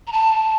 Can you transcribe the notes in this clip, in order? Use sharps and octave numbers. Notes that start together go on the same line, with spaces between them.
A#5
A5